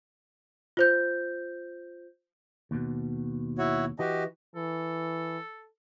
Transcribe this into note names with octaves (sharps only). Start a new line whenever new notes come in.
F4 C5 G6
D#2 B2
E4 F#4 C#5
E3 F#4 G4 D#5
E3 A4